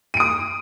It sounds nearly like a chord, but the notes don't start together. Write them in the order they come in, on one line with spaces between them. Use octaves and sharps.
D#7 D7 D#6